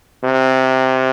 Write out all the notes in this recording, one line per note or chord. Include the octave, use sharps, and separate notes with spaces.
C3